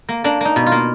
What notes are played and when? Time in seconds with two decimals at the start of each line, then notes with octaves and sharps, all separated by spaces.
0.09 A#3
0.24 A#3 D4
0.41 A#3 D#4
0.56 B2
0.66 F4
0.72 A#3